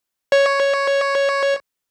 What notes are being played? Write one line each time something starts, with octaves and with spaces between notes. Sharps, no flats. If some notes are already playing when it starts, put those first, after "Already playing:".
C#5